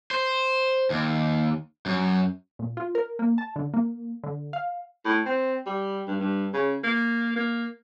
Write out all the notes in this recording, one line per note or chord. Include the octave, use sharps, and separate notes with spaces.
C5
D#2
F#2
A#2
F4
A#4
A#3
A5
D3
A#3
D3
F5
A2
C4
G3
G2
G2
C#3
A#3
A#3